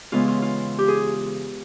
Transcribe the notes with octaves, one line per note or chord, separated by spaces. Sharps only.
C#3 E3 G#3 B3 F4
F4
F4
G4
G#4